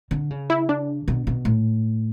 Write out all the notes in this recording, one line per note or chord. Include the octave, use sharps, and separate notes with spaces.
D3
C#3
E4
D4
B2
B2
A2